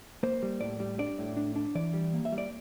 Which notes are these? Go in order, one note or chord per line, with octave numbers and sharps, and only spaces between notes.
A#3 C5
G3
A2 D5
G3
D4 D5
A2
D4
D4
E3 D5
G3
A#3
E5
G3
D5